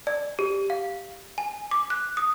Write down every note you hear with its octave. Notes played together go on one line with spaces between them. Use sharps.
D5
G4
F5
G#5
D6
F#6
D#6